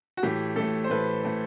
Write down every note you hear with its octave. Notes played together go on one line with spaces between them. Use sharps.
F#4
A2 E3 A3 G4
A2 E3 A3 A4
C5
A2 E3 A3 B4
A2 E3 A3